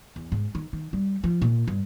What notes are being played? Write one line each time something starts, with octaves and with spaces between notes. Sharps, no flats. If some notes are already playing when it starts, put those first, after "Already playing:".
E2
G#2
D#3
D#3
G3
F3
A#2
G2